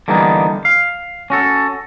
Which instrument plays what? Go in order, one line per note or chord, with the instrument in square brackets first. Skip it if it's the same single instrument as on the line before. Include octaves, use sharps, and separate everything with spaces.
[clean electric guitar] D3 E3 G3 A#3 B3 D#4
F5
C#4 F#4 A4